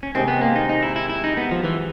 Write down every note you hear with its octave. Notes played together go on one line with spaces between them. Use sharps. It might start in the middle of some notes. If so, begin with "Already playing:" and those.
C#4
C3 D#3 G#3 C4
B3
A#3
D#4
D#4
E4
E4
E4
D#4
B3
F3
E3